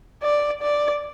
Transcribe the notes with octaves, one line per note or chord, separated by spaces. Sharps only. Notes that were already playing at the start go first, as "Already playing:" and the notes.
D5
D5